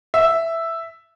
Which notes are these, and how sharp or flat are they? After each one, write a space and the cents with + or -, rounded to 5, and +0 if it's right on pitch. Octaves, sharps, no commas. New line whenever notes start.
E5 +0